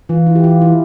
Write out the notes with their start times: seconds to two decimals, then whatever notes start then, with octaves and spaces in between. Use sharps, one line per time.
0.09 E3 F4
0.27 E4
0.35 G4
0.44 F4
0.62 E4